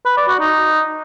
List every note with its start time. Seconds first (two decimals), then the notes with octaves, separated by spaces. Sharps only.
0.06 B4
0.17 D5
0.28 F#4
0.40 D#4